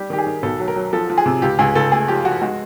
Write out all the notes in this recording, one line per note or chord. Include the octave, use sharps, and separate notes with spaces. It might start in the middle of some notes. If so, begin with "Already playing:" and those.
Already playing: G3 G4
D#3 G4
G#4
D#3
B1 A4
F#3
A#4
F#3
F3 A4
F3
G#4
C3
C#2 G4
C#2 G#4
C#2 A4
A3 G#4
F3 G4
F3 F#4
G#3 F#4